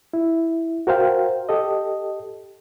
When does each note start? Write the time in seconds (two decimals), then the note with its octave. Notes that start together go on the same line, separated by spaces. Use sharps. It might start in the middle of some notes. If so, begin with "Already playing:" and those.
0.14 E4
0.87 F#4 A#4 C5 F5 G5
1.49 G4 A4 D#5